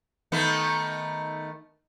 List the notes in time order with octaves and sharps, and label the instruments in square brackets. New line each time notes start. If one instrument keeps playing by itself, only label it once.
[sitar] D#3 A3 B3